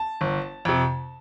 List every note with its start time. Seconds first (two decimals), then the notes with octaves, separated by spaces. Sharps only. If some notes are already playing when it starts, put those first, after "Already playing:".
Already playing: A5
0.21 G1
0.65 F2 C3